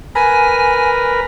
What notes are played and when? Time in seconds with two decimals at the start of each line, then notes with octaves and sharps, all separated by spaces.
0.15 A#4 B4 G#5